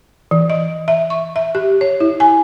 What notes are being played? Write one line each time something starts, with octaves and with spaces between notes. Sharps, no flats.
E3
D#5
E5
C#6
E5
G4
C#5
E4
G#5